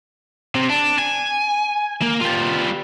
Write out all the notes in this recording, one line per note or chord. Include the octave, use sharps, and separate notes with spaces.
C3
D4
G#5
A#3
G3 F4